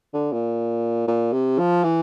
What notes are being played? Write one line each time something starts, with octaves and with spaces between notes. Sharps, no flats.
D3
A#2
A#2
C3
F3
E3